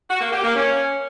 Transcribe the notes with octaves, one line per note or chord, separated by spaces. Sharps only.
F#4
A#3
G4
A#3
C#4